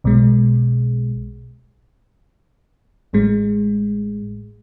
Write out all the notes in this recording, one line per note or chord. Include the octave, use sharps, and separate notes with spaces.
B1 B2 G#3
A1 A2 G#3